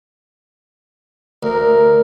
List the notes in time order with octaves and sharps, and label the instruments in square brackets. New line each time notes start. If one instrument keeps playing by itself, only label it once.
[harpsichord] D2 [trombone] A#4